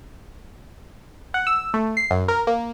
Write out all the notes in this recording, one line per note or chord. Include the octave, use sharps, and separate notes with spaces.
F#5
E6
A3
C7
F#2
A#4
A#3